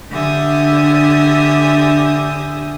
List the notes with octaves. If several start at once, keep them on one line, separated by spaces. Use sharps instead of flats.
D3 D4 G4 E5 G#5 D#6